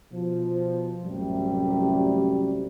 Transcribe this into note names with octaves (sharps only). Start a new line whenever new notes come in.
B2 F3
A1 F#2 C3 G3